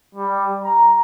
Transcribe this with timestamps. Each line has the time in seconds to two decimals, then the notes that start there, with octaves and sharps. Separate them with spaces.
0.15 G3
0.64 A#5